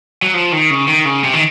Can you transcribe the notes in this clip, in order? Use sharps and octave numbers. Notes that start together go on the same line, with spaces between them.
F#3
F3
D#3
C#3
D#3
C#3
C3
D#3